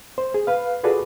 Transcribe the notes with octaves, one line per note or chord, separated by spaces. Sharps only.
C5
G#4
B4 F5
F4 F#4 G#4 A4 B4 D5